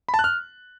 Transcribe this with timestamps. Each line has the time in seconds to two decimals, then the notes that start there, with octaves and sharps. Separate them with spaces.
0.09 B5
0.14 A5
0.19 F#6
0.24 F6